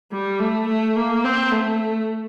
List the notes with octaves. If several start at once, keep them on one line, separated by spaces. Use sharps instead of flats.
G3
A3
A3
A#3
C4
A3